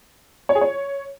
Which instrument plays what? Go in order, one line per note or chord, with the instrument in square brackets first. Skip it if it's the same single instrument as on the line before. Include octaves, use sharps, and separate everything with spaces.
[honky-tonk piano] C#5
G#4
C#5